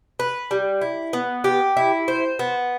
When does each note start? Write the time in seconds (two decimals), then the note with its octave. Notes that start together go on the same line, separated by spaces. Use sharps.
0.19 B4
0.51 G3
0.81 E4
1.13 B3
1.44 G4
1.77 E4
2.08 C5
2.39 B3